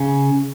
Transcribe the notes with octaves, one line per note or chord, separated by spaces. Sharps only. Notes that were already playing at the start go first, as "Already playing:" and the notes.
Already playing: C#3